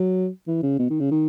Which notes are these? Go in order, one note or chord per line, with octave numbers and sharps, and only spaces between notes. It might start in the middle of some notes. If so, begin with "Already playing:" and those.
Already playing: F#3
E3
C#3
B2
D#3
C#3
D#3